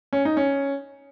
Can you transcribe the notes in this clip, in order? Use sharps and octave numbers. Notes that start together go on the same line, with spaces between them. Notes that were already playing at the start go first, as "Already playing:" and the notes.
C#4
D#4
C#4